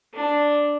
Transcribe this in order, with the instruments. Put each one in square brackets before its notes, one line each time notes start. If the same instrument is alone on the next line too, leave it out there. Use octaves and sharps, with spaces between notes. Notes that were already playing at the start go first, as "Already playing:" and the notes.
[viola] D4